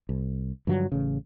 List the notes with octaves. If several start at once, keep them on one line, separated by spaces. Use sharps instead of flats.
C2
G2 D3 F3 F#3
A1 C#3